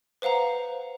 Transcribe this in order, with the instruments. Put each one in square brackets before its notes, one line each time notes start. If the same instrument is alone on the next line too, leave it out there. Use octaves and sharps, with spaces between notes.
[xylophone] B4 C5 F5 F#5 A#5